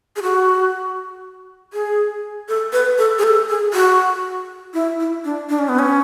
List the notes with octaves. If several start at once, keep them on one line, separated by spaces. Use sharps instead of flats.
G#4
F#4
G#4
A4
B4
A4
G#4
A4
G#4
F#4
E4
E4
D4
D4
C#4
B3
C#4